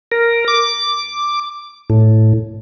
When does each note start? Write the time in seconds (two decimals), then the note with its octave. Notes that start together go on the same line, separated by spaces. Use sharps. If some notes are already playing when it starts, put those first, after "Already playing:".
0.12 A#4
0.48 D6
1.90 A2